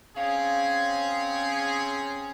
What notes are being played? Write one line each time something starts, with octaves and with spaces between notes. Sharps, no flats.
C4 C#4 G#4 F5